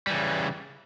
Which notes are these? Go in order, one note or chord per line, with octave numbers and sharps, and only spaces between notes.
C#3 E3 G3